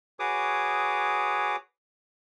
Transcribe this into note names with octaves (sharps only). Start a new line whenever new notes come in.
F#4 G#4 B4 C#5 D6 D#6